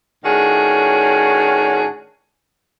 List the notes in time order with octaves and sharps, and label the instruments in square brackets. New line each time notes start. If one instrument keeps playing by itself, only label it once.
[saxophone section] A2 D#3 C#4 D4 F#4 G#4